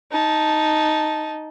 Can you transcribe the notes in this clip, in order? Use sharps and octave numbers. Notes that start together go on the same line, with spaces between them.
D#4 A5